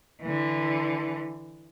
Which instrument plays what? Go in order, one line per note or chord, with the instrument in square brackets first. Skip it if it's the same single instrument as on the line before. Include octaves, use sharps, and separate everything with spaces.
[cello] D3 E3